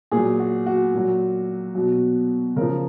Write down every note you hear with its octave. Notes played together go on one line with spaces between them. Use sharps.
A#2 G#4
F#3
F#4
F#4
A#2 F#3
B2 F#3
C#3 F3 A#4